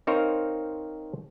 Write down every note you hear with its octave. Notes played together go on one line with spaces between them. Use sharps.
C4 D#4 A#4 C5 C#5 F5